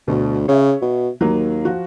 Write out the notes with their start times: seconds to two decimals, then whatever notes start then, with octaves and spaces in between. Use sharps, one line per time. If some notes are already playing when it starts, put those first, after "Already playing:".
0.08 D2 B2
0.48 C#3 C#5 E5
0.82 B2
1.21 D#2 F#3 A#3
1.65 F3 F#4